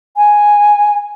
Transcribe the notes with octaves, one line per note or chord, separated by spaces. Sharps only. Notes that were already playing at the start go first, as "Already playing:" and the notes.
G#5